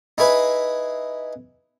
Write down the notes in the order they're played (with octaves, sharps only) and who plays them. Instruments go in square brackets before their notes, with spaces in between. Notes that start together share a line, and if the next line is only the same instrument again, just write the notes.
[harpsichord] D#4 E4 G#4 B4